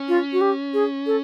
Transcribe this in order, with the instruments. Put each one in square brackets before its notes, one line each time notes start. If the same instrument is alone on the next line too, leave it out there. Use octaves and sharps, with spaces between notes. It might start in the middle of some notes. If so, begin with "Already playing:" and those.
Already playing: [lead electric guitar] C#4
[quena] F4
F#4
G4
G#4
A4